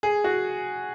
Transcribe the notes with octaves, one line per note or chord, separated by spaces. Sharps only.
G#4
F#4